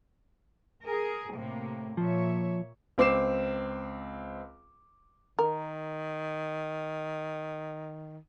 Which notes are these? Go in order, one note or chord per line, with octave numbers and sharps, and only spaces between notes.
G#4 A#4
A2 C3 A#3
A#2 F3 C#5 E5
C#2 C4 D6 C7 E7
D#3 A#4